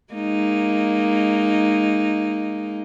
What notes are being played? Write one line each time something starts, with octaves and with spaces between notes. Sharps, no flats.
G#3 A#3 D#4